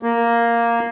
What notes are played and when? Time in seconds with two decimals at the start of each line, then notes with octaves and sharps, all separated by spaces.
0.03 A#3